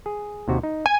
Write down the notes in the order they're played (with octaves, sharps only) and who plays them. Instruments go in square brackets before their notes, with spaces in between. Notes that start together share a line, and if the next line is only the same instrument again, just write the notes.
[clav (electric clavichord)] G#4
D#2 C3 F#4
D#4
[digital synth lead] G#5